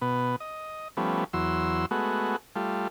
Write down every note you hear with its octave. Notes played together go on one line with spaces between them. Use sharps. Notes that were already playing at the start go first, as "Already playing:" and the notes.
B2 B3
D#5
F3 G3 A3 B3 C#4
E2 F#3 C6 E6
G#3 A3 B3 F#4
G3 A3 F4